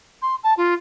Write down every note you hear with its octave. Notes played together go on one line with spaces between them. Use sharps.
C6
A5
F4